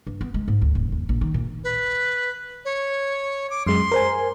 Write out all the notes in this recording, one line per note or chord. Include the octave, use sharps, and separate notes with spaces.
G2
B3
G#3
G#2
D2
D#1
D#2
A#1
D#3
A#2
B4
C#5
D6
F#2 G#3 C6
A#4 C5 G#5